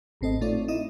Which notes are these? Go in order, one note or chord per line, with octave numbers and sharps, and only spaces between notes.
G#1 A2 C4 A4 D#5
A3 D#4 F4 C#5 D5
D#4 E4 D#5